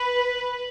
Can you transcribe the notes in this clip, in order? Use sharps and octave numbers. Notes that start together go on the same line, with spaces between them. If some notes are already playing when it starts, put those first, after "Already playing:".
Already playing: B4